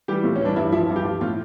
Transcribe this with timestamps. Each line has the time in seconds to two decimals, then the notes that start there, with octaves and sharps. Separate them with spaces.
0.08 E3 G3 G4
0.24 A2 F4
0.36 C#4
0.41 E3 G3 D4
0.56 G2 E4
0.72 F3 E4
0.90 G2
0.96 G4
1.05 F3 F4
1.21 A2 F4